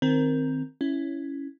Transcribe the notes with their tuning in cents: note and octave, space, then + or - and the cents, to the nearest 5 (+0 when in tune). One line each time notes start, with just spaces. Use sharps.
D#3 +0 C4 +0 A#4 +0
C#4 +0 E4 +0